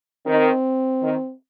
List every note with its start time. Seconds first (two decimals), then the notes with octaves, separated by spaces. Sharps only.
0.26 D#3 C4
1.02 D#3